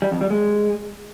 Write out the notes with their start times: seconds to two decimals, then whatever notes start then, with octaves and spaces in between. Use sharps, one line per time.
0.02 G3
0.11 F2
0.21 G3
0.30 G#3